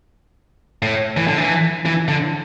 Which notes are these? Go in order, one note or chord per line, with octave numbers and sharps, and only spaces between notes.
A2
E3
D3
E3
E3
D3